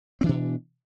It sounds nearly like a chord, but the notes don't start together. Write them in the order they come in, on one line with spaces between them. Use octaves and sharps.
C4 E3 D4 B2